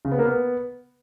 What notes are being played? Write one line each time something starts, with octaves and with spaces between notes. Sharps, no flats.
C#3
B3
A#3
B3